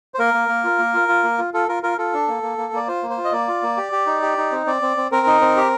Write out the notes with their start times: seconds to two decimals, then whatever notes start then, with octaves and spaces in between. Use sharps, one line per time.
0.14 C5
0.19 A#3 A#4
0.34 A#3
0.49 A#3
0.64 F4
0.79 A#3
0.94 F4
1.08 F4
1.24 A#3
1.38 F4
1.54 F4 A4
1.68 F4 A#4
1.83 F4 A#4
1.98 F4 A4
2.14 D4
2.28 A#3
2.43 A#3
2.58 A#3
2.73 A#3 D5
2.88 F4 C5
3.03 A#3
3.10 C5
3.18 F4
3.24 D#5
3.32 A#3 D5
3.48 F4
3.63 A#3
3.77 G4
3.92 G4
4.07 D#4
4.22 G4
4.38 D#4
4.52 C4
4.66 C4 D5
4.82 C4
4.97 C4
5.12 C4 A#4
5.27 D#4
5.41 C4
5.57 G4